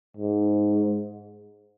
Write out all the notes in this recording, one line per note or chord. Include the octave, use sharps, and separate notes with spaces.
G#2